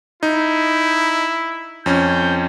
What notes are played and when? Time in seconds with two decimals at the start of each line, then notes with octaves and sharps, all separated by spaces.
0.23 D#4 E4
1.86 F2 C#4 G6